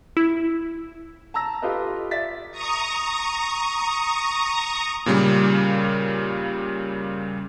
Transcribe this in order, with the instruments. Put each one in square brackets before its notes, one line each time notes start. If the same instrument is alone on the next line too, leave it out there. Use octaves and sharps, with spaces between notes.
[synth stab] E4
[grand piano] A5 A#5 E6 A#6
F4 G4 A4 B4 D#5
D5 E5 A6 B6
[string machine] A#5 C#6 D#6
[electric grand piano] A#2 C#3 G3 A#3